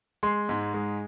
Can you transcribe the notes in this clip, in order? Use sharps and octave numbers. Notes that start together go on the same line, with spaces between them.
G#3 C6
G#2
G#3